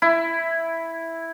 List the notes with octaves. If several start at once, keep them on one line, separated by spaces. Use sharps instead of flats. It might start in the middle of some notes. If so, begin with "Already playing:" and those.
E4